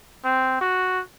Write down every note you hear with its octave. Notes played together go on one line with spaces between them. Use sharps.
C4
F#4